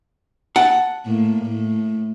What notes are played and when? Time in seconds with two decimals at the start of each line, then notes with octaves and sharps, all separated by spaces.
0.56 F#5 A5
1.06 A2 A#3
1.44 A2